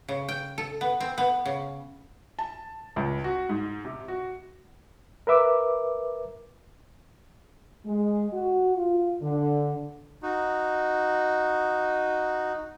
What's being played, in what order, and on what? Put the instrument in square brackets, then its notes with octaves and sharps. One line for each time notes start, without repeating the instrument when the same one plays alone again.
[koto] C#3
G5
A4
B3
C4
B3
C#3
[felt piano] A5
C#2
F#4
G#2
C3
F#4
[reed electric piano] A#4 B4 E5 D6
[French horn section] G#3
F#4
F4
D3
[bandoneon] D#4 F#4